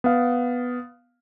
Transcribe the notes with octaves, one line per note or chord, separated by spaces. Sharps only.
B3 F5